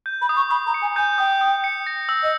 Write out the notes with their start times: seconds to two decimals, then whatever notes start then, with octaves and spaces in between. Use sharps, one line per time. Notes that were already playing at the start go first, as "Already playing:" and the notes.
0.06 G6
0.22 B5
0.29 D#6
0.36 C#6
0.51 B5 D#6
0.67 A#5
0.74 C#7
0.82 G#5
0.96 G#5 G6
1.18 G5 D#6
1.41 D#6
1.64 C#7
1.87 A#6
2.09 E6
2.23 D#5